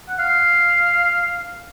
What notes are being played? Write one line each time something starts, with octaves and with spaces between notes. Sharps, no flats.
F#5
F5